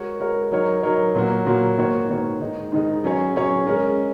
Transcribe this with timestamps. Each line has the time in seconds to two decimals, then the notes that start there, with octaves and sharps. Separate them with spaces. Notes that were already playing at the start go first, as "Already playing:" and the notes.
Already playing: G#3 F#4 A#4 C#5
0.20 G#3 F#4 A#4 C#5
0.51 F#3 D#4 A#4 C#5
0.83 F#3 D#4 A#4 C#5
1.15 A#2 F#3 A#3 F#4
1.46 A#2 F#3 A#3 F#4
1.78 G#2 D#3 A#3 F#4 C#5
2.08 G#2 D#3 A#3 F#4 C#5
2.40 G#2 D#3 G#3 D#4
2.72 G#2 D#3 G#3 D#4
3.04 F#3 C#4 G#4 C#5
3.35 F#3 C#4 G#4 C#5
3.67 G#3 C#4 A#4